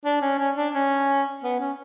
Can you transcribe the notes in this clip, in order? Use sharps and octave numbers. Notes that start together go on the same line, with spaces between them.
D4
C#4
C#4
D4
C#4
B3
C#4